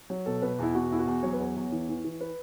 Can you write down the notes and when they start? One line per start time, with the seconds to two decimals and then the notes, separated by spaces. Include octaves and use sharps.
0.10 F#3
0.26 B2 A4
0.42 B2 B4
0.59 E2 E4
0.75 B2 F#4
0.91 E2 E4
0.99 F#4
1.07 E2
1.23 F#3 C#5
1.33 B4
1.40 E2 C#5
1.56 E2
1.72 E3
1.89 E3
2.04 E3
2.21 B4